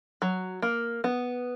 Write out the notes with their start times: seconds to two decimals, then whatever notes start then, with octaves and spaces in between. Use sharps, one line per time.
0.22 F#3
0.62 A#3
1.04 B3